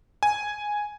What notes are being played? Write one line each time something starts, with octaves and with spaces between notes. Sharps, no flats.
G#5